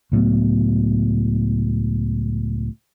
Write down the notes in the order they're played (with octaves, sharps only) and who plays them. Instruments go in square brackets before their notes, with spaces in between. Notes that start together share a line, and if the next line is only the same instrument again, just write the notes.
[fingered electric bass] C#2 A2 F#3 B3